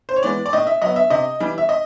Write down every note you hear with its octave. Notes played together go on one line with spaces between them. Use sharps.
C5
C#5
E3 G#3 B3 D5
D5
A2 D#5
E5
F#3 B3 D#5
E5
C3 D#5
E3 G3
E5
D#5